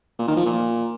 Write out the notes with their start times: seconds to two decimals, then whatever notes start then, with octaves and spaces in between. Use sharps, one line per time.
0.19 A#2
0.28 D#3
0.37 F3
0.46 A#2